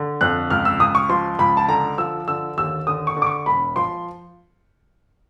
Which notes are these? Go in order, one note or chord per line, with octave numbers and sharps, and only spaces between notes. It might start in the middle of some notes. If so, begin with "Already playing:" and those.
Already playing: D3
F2 F#6
C#2 F6
E6
C#2 D#6
C#6
F3 C6
C#2 B5
A5
D3 A#5
F3 E6
D3 E6
D#2 E6
D3 D#6
C#6
D3
D6
C#6
E1 B5
F3 C6